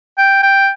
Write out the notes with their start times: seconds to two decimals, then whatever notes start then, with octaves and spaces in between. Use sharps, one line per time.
0.18 G5
0.43 G5